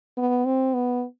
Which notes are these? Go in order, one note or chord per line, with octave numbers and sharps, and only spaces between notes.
B3
C4
B3